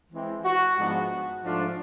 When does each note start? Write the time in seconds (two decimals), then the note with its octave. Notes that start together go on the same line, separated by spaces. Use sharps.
0.12 E3 G#3 C4
0.44 F#4
0.77 G#2 F3 G#3 B3 D4 F#4
1.43 G#2 F3 A3 D4 F4